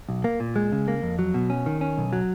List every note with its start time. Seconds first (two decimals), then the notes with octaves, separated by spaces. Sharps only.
0.09 B1
0.24 A#3
0.40 A#2
0.56 G#3
0.72 C#3
0.88 A#3
1.02 F2
1.19 F#3
1.34 B2
1.50 C#4
1.66 D#3
1.81 C#4
1.98 B1
2.13 F#3